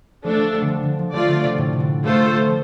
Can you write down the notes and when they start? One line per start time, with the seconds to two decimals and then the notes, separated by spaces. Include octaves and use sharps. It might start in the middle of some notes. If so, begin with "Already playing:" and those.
0.24 F3 A3 D4 A4
0.38 F3
0.54 G3
0.62 D3
0.68 F3
0.83 D3
0.99 F3
1.13 F3 A3 F4 D5
1.29 D3
1.44 C3
1.58 A2
1.73 C3
1.80 D3
2.03 G3 A3 F4 A4 C5
2.48 F3